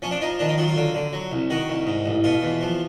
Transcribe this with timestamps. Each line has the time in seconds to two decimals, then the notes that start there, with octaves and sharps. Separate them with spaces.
0.02 F3 C#4
0.11 D4
0.21 F3 D#4
0.39 D#3 D4
0.49 D#4
0.58 F#3 F4
0.68 F4
0.76 D3
0.94 D3
1.13 F#3
1.32 C2
1.50 D#3 F#4
1.70 C2
1.87 G#2
2.06 A1
2.24 B2 F4
2.43 E2
2.61 F3